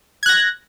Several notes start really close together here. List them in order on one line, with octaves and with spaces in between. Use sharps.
G#6 F#6 A#6